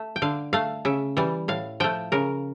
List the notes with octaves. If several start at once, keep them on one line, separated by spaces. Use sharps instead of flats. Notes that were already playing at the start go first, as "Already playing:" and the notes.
Already playing: A3
G5
D3 F5
A3 F5
C#3 E5
E3 G3
A2 F5
F3 A3 G5
C#3 A#4